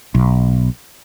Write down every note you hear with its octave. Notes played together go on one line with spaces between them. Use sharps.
B1